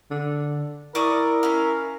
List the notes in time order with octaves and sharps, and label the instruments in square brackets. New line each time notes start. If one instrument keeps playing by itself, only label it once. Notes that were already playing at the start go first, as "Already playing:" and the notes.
[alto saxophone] D3
[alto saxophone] E4 [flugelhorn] A#4 [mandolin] D5 C#6 D#6
[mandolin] C#4 F5